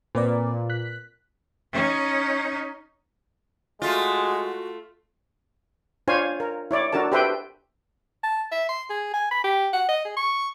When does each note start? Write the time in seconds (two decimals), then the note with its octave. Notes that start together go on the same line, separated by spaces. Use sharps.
0.15 A#2 C4 B4 D5
0.70 F#6 B6
1.73 C#4 D#4
3.82 G#3 A3 F4 F#4
6.08 D4 F4 C5 C#5 F5 G#5
6.40 A#4
6.71 E4 C#5 D5
6.93 D4 F#4 A4 A#4 A5
7.12 G4 A4 B4 C5 E5 G5
8.24 A5
8.52 E5
8.69 C6
8.90 G#4
9.14 G#5
9.31 B5
9.44 G4
9.73 F#5
9.89 D#5
10.05 G#4
10.17 C#6